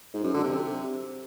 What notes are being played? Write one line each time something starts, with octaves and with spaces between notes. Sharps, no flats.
G#2
F#2
D3
C3